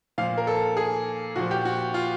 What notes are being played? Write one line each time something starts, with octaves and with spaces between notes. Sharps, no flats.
A#2 F3 F5
A#4
A4
G#4
A#2 F3 F#4
G4
F#4
F4